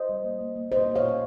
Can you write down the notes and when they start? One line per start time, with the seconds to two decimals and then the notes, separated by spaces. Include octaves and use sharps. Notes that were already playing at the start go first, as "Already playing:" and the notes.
Already playing: C5 D#5
0.09 G3
0.24 A#3
0.41 A#3
0.56 A#3
0.72 A#2 C5 D#5
0.88 A#3
0.95 C#5 F5
1.03 A#2
1.08 F5